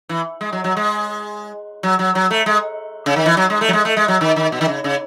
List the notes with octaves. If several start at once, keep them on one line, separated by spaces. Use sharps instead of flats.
E3
G#3
F#3
F#3
G#3
F#3
F#3
F#3
A3
G#3
C#3
D#3
E3
F#3
G#3
A3
F#3
G#3
A3
G#3
F#3
D#3
D#3
B2
D#3
C#3
C#3